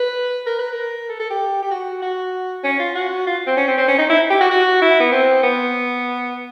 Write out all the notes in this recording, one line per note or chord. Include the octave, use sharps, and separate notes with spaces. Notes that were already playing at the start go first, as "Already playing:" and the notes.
Already playing: B4
A#4
B4
A#4
A4
A4
G4
G4
F#4
F#4
C#4
F4
F#4
F4
C4
C#4
C4
C4
C#4
D#4
E4
G4
F#4
F#4
E4
B3
C4
B3